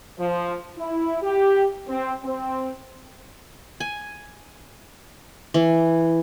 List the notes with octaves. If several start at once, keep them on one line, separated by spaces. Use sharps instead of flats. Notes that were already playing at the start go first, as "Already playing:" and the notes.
F3
E4
G4
C4
C4
G#5
E3